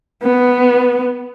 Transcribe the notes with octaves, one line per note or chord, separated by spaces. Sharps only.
B3